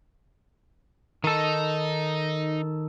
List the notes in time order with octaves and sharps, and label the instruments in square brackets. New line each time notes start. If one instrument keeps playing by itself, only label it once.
[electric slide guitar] D#3 A4 [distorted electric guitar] D#4